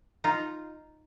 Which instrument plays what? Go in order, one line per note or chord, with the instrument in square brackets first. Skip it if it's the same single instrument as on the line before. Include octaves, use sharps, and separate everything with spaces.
[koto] D#4 F4